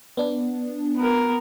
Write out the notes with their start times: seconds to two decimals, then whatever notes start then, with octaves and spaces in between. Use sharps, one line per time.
0.17 B3 D4
0.97 B3 A#4